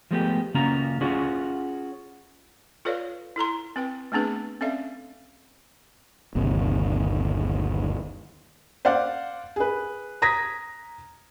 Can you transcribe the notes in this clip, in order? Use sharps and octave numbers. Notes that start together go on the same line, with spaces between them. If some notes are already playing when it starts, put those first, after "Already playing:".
F3 G#3 A3 B3 D4 G4
C#3 A#3 C#4 F4 F#4 A#5
C#4 F4 F#4 G#4 C#5
F4 A4 B4 C#5 D5 F5
E4 A4 A#5 C6
C4 B4 G5
A3 B3 C4 D4 G#4 B4
C4 C#4 A4 D5 E5 F5
G1 D#2 C3
C5 D5 F5 F#5
G#4 B4
A#5 D#6 G#6 A#6 B6